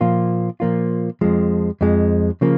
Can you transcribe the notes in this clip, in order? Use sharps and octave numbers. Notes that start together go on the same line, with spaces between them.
A#2 F3 A#3 F4
A#2 F3 A#3 F4
F2 F3 G#3
F2 F3 G#3
C#3 F3 A#3